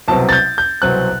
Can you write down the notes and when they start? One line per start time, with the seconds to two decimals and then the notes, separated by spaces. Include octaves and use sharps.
0.08 C2 B2 F#3 C4 A5
0.29 A6
0.33 G6
0.58 G6
0.82 C2 B2 F#3 C4 F#6